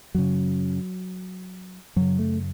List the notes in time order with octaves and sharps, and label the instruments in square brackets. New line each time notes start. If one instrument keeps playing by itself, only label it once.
[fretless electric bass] F#2 C#3 F#3
F#2 C#3 F#3
A3